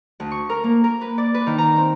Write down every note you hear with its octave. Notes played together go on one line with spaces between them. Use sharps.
D2
C#6
A#4
A#3
A#4
B4
D5
B4
D#3
A#5
C4